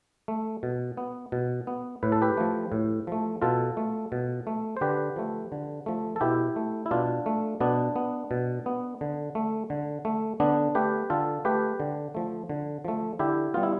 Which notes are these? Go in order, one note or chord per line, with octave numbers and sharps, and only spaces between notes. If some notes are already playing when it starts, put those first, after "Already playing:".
A3
B2
B3
B2
B3
A2 B4
A4
G4 B4
F3 A3
A2
F3 A3
B2 F4 A4
A3
B2
A3
C5
D3 G4 B4
F3 A3
D3
F3 A3
A4
B2 E4 G4
A3
E4
B2 D4 F4
A3
B2 B3 D4
B3
B2
B3
D3
A3
D3
A3
D3 B3 D4
A3 G4 B4
D3 F4 A4
A3 G4 B4
D3
F3 A3
D3
F3 A3
D3 E4 G4
G3 B3 F4
E4